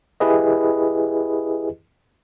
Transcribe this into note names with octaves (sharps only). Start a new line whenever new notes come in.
E4 G4 G#4 B4 D#5